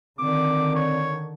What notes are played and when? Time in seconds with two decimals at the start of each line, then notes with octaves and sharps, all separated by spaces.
0.19 D3 D#3 C4 D5 D6
0.76 C#5